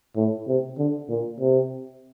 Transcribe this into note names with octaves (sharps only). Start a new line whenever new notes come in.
A2
C3
D3
A#2
C3